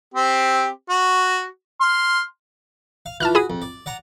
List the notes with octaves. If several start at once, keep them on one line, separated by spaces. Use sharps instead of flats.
C4 G4
F#4
C6 F6
F5
E3 F3 A5 F6 F#6
F#4 G#4 B5 D#6
F2
D5
D5 F#5 A#5